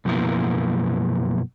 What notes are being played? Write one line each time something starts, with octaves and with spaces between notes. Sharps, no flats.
F#2 B2 F3 A#3 B3 E4